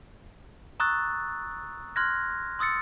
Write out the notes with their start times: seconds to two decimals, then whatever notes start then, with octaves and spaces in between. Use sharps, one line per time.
0.80 A#5 C#6 D#6 E6 F#6 A6
1.96 C6 F6 F#6 G#6 A#6
2.59 C6 D#6 E6 A6 C#7